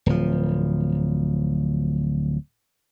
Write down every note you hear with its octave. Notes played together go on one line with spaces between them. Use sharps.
D1 F3